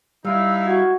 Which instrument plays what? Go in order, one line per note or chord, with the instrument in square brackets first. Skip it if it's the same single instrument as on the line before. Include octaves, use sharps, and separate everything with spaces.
[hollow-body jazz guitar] G3 [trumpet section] D#4 E4 F5 [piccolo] E6
[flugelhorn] F#4 [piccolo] G#6